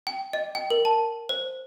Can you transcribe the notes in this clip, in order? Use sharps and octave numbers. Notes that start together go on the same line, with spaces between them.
G5
D#5
G5
A#4
A5
C5